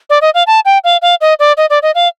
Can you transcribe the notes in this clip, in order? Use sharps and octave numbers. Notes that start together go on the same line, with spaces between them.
D5
D#5
F5
A5
G5
F5
F5
D#5
D5
D#5
D5
D#5
F5